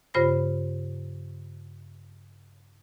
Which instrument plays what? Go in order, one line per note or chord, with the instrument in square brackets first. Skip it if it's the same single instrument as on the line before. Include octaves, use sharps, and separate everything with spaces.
[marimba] G2 C#3 F4 C5 B5 A#6